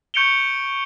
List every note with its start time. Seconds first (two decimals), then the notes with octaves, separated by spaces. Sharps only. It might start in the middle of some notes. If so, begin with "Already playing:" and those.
0.14 C#6 G6 C#7 D7 F7 G7